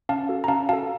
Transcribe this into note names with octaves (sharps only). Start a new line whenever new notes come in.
C#4 F5 A5
F#4 A4
A#5
C#4 F5 A5
F#4 A4 F5 A5